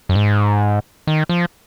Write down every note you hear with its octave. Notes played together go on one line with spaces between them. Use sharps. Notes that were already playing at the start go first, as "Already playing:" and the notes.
F#2
G#2
D#3
F3